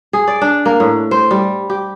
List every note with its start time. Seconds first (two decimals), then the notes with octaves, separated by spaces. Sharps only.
0.13 G#4
0.28 D5
0.41 D4
0.65 A#3
0.80 A2
1.11 C5
1.31 G3
1.70 G4